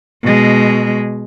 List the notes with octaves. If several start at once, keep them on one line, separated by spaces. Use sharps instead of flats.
B2 G#3